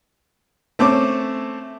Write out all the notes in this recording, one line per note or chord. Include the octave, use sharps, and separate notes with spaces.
A3 C4 C#4 D6